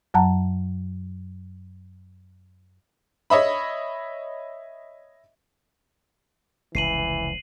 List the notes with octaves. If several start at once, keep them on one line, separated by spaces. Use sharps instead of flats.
F#2 F#3 F#5 A5 A#5
C#5 D#5 E5 B5
F1 C#2 E3 C7 D#7 F#7